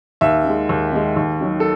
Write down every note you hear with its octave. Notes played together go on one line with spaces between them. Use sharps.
D#2 E5
D#3 G#3
D#2
D#3 G#3
D#2
D#3 F#3
A4